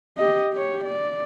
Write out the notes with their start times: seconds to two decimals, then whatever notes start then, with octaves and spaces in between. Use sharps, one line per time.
0.18 G4 D#5
0.53 G4 C#5
0.84 D5